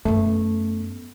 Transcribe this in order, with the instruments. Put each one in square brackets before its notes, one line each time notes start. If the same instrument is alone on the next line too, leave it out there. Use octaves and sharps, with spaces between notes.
[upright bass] F#2 B3 [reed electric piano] A3